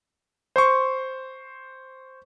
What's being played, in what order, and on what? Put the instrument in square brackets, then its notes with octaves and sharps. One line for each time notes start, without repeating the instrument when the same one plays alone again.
[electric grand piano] C5 C6 C#6